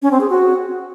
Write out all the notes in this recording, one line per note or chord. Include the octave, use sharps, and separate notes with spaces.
C#4
C4
G#4
F#4